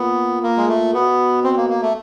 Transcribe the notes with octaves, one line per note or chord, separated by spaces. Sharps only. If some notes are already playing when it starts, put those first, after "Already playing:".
Already playing: A#2 B3
A#3
G#3
A3
B2 B3
C4
A#3
A#3
A3